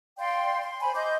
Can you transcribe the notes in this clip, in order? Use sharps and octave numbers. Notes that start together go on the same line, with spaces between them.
D5 F5 G5 C6
C6
C5 G#5 B5
D#5 C6 D6 G6